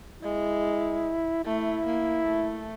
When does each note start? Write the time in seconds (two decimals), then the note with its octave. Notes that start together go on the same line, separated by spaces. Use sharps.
0.23 G#3 E4
1.45 A3 E4
1.86 A#3
2.27 A3